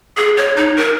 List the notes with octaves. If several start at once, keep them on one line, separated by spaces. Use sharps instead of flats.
G#4
C#5
D#4
A#4